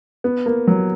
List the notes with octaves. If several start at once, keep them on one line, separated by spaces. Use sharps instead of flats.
B3
A#3
F#3